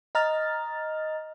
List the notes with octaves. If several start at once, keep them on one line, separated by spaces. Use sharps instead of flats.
D#5 A#5 F6 A6